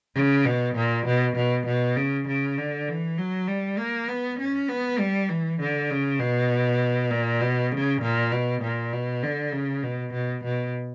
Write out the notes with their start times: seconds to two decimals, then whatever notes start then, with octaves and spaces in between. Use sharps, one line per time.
0.15 C#3
0.45 B2
0.76 A#2
1.06 B2
1.36 B2
1.66 B2
1.96 C#3
2.27 C#3
2.58 D3
2.88 E3
3.18 F#3
3.48 G3
3.78 A#3
4.08 B3
4.39 C#4
4.68 B3
4.99 G3
5.29 E3
5.60 D3
5.90 C#3
6.19 B2
7.11 A#2
7.41 B2
7.72 C#3
8.02 A#2
8.32 B2
8.62 A#2
8.92 B2
9.23 D3
9.52 C#3
9.83 B2
10.13 B2
10.44 B2